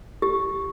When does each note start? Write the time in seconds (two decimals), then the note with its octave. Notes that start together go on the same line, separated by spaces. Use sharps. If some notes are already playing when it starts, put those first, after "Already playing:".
0.22 G4